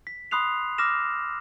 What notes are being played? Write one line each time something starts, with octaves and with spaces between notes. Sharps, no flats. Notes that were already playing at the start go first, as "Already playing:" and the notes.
B6
B5 C6 D#6 F#6 C7 F7
D6 E6 F6 A#6 E7